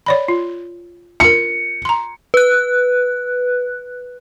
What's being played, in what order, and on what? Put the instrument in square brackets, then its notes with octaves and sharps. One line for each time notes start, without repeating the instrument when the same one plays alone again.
[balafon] C#5 D5 B5
F4
[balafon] F4 A#4 [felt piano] C#7
[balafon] A#5 C6
[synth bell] B4 F#6